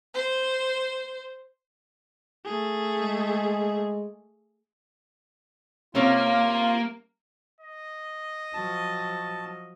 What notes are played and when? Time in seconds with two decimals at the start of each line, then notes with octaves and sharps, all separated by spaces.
0.14 C5
2.45 A3 G#4
3.02 G#3
5.95 C3 A#3 C#4 F4 C#5
7.61 D#5
8.54 F3 F#3 A5